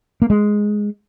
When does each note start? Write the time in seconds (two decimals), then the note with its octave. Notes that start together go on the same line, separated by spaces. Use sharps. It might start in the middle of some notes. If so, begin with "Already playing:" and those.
0.22 A#3
0.30 G#3